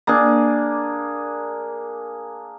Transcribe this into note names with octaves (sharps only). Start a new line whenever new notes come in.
A#3 D4 G#4